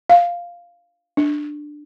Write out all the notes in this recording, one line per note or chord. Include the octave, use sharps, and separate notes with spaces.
F5
D4